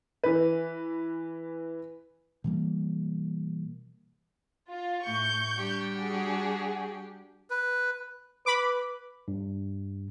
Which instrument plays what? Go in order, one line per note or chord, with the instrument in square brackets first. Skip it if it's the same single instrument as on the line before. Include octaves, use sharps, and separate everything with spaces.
[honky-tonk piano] E3 B4
[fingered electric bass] B2 E3 G3 A#3
[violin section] F4
[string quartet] A2 [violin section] C#6 G6
[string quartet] G3 D4 G4
[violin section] F#4 G#4
[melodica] B4
[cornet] B4 [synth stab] B5 D6
[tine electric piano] G2